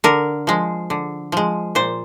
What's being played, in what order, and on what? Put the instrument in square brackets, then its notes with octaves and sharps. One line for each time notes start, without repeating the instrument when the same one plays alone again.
[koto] D3 A#4
F3 G#3
D3
F3 G#3
A#2 C5